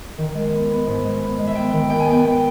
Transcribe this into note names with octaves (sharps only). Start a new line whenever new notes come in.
D#3
G#3
B3
B3
G#2
G#3
B3
G#3
E5
B3 G5
D#3
B3 G5
G#5
B3 G5
B3 G5